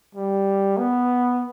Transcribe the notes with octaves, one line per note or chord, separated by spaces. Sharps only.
G3
B3